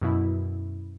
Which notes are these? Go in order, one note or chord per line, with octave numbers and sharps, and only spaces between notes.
F#2 B2 E4